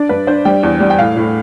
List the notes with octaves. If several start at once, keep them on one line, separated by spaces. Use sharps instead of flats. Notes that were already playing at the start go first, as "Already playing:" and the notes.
Already playing: D4 D5
G2 B4
D4 C5
G3 G5
E2
G3
G5
A2 F5
A2